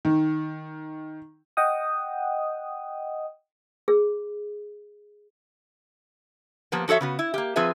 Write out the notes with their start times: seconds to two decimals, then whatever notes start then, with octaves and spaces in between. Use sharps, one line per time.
0.05 D#3
1.57 D#5 F#5 G5 D#6
3.88 G#4
6.72 F3 A#3 B3 G4
6.88 F3 F#4 A4 C#5 E5
7.01 C#3 B3 F#4
7.19 E4
7.34 A#3 G4
7.56 F3 C4 F4 G#4 B4 E5